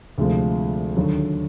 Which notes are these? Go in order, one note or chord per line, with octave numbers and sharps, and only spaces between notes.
D2 C3 F3 G#3
D#2 D3 F#3